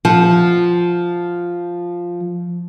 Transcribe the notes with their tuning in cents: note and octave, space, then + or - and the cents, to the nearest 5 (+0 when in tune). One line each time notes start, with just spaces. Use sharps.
F3 +0 F#5 +0